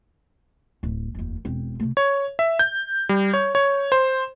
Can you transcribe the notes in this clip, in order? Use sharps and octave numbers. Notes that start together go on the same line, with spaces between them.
D1
F1 D#2
E1 C4
C3 A3
C#5
E5
G6
G3
C#5
C#5
C5